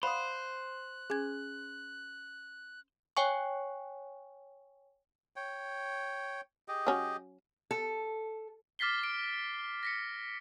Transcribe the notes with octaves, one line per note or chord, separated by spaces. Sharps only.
C5 D5 F5 F#5 B5 D#6 F#6
C#4 G#4 G#5 G#6
C#5 G5 G#5 C#6
C#5 G5
G4 G#4 D#5
F#3 C#4
A4
D6 F6 A6 B6 C7 G7
F6 D7
A#6 B6 C#7